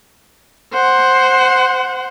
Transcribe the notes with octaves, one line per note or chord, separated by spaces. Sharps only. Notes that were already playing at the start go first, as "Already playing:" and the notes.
C5 F#5